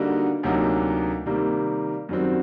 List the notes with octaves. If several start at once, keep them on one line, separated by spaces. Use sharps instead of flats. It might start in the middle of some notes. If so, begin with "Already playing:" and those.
Already playing: D3 G3 A#3 D#4 F#4
D2 C3 F#3 A#3 D#4
C3 D#3 G3 A#3
F#2 D#3 G3 C4 F#4